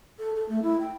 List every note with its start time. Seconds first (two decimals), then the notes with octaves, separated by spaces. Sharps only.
0.19 A4
0.36 A4
0.49 A3
0.62 E4
0.80 G5